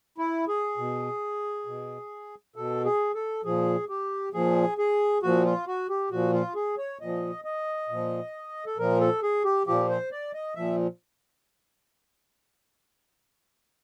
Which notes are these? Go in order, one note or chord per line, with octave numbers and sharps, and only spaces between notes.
E4
G#4
B2
B2
B2 A4
G#4
A4
A#2 F3 G#4
G4
A#2 F3 G#4
G#4
A#2 F3 F#4
F4
F#4
G4
A#2 F3 F#4
F4
G#4
C#5
A#2 F3 D#5
D#5
A#2 F3
A4
A#2 F3 A#4
A4
G#4
G4
A#2 F3 G4
C5
D5
D#5
A#2 F3 E5